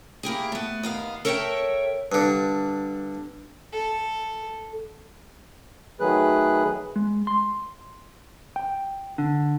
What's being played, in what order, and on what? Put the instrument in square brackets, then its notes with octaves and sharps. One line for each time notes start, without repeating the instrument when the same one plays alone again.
[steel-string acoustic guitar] A#3 E4 G4 G#4
A3 B3
D#2 B3 F5
A4 A#4 C#5 E5 F5 G5
[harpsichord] G2 D3
[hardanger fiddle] A4
[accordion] D#3 F#3 A3 G#4 B4 F#6
[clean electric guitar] G#3
C6
G5
D3